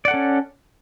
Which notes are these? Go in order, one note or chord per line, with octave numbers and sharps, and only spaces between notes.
C#4 A4 D5 F#5